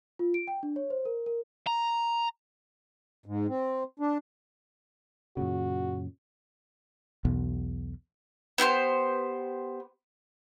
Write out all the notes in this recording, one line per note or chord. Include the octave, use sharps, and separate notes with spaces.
F4
D7
G5
D4
C#5
C5
A#4
A#4
A#5
G#2
C4
D4
F#2 A#2 C#3 F#4
B1 E2 B2
B3 G4 A4 C5